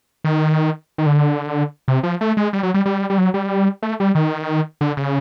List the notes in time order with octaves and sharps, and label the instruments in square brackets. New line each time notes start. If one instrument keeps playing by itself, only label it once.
[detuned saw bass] D#3
D#3
D3
C3
F3
A3
G#3
G3
F#3
G3
G3
G3
F#3
G3
A3
G3
D#3
D3
C#3